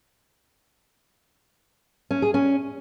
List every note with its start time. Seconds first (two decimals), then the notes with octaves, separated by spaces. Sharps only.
2.11 C#4
2.22 G#4
2.34 C#4